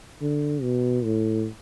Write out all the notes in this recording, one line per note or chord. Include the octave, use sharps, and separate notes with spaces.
D3
B2
A2